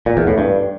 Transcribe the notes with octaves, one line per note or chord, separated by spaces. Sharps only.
A#2
E2
A2
G2